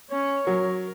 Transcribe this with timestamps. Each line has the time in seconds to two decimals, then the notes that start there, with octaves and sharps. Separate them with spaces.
0.11 C#4 C#5
0.47 F#3 A#4